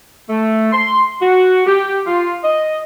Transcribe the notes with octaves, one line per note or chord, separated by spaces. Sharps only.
A3
C6
F#4
G4
F4
D#5